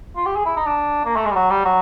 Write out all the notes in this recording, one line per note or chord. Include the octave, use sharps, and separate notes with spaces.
F4
G4
G#4
E4
D#4
D4
A#3
A3
G#3
G3
F#3
G3
F#3